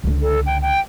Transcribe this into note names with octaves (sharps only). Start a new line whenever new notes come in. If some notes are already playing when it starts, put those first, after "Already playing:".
C#2 D3
A4
G5
G5